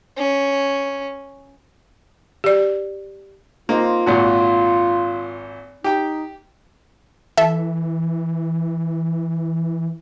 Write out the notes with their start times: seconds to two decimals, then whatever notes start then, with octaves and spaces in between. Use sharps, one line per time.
0.17 C#4
2.44 G4 D5
3.69 A#3 C4 D#4 F4
4.06 G#1 A#2 F#4
5.84 D#4 G4 G5
7.37 E3 A4 E5